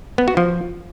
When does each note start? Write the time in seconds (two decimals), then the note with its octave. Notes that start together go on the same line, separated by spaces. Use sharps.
0.18 B3
0.28 F#4
0.37 F3